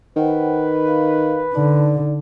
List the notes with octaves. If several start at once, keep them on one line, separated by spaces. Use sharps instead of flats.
D#3 B4 C5 F#5 G5
F5
D3 D#4 D5 A5